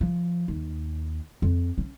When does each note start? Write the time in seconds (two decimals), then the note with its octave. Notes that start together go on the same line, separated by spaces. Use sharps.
0.01 F3
0.48 D#2
1.42 F2
1.78 C#4